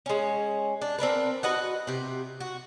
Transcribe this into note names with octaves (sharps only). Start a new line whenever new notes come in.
G#3 C#4
D4
C4 D4 A#4 B4
F#4 B4 D#5 F#5
C3 G4
F#4